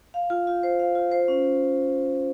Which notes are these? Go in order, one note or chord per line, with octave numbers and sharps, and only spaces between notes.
F5
F4
F4
C5
F5
F4
C5
C#4